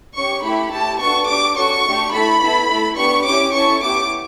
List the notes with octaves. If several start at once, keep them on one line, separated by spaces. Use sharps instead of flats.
C#4 G4 C#6
A3 E4 G4 B5
A3 E4 G4 A5
B3 D4 F#4 A4 C#6
D4 G4 D6
C#4 F#4 A4 C#6
A3 D4 G4
A3 E4 A4 B5
B3 E4 A4
A3 E4 A4
B3 D4 G4 C#6
C#4 E4 G4 D6
C#4 E4 A4 C#6
B3 E4 G4 D6